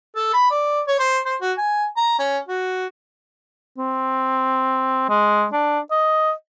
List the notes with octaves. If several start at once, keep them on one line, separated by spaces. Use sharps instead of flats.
A4
B5
D5
C#5
C5
C5
F#4
G#5
A#5
C#4
F#4
C4
G#3
D4
D#5